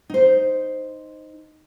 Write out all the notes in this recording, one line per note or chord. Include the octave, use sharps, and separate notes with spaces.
D#4 C5